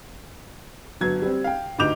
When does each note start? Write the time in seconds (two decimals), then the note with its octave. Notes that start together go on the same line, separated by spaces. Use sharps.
1.01 G1 F#3 G#6
1.22 G3 C4
1.44 F5 G5
1.79 D2 G2 D#4 D6 G6 F7